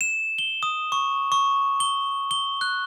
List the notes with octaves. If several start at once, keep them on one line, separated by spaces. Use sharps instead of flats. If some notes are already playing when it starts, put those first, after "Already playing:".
E7
G7
D#6
C#6
C#6
G7
G7
F#6